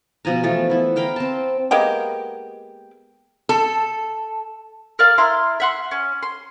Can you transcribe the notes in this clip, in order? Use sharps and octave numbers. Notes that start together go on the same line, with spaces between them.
B2 F3 G#5 A#5
E3 F3 A3
B3 E4
F5 G5 A#5 B5
C4 A5
G#3 A#3 B3 G4
A4
A#4 D5 F5
E4 A#5 C6 F6
E5 F#5 C6
C#4
C6